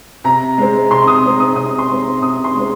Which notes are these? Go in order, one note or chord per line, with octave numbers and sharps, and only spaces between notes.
C3 A#5
G#3 C4
C3 C6
D#6
G#3 C4
D#6
C3 D#6
C6
G#3 C4
A#5
C3 D#6
C6
G#3 C4